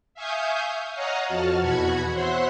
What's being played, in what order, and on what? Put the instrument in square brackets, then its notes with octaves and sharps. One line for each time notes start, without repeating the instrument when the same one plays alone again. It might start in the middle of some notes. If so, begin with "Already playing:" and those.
[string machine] E5 F5 G#5 C#6 D#6 G6
C#5 D#5 F5 F#5 A#5 D#6
F2 F#4 A5 F6
E2 B2 F#4 F#5 B5 G#6
C5 C#5 E5 F#5 C6 F#6